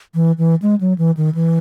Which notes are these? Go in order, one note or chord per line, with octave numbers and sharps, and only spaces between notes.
E3
E3
G#3
F#3
E3
D#3
E3